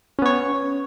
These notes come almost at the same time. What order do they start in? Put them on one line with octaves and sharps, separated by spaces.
C#4 B3 C#5